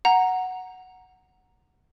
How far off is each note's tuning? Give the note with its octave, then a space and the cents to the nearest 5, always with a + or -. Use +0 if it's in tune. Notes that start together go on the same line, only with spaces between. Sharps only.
F#5 +0 A#5 +0